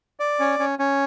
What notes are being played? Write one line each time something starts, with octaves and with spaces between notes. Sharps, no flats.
D5
C#4
C#4
C#4